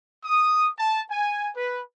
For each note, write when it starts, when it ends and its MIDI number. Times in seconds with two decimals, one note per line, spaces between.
0.25 0.69 87
0.78 1.02 81
1.09 1.49 80
1.56 1.82 71